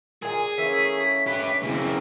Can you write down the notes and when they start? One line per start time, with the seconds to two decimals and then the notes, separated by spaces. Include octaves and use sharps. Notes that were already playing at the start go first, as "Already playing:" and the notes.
0.22 A#2 G#4 G#5
0.58 E3 A3 A#3 C#4 B6
1.27 G4 B4
1.64 C#3 E3 A#3 C4